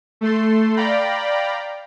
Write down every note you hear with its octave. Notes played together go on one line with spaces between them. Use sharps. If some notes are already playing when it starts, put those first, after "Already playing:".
A3 A4 C6
D5 F5 G5 A#5 B5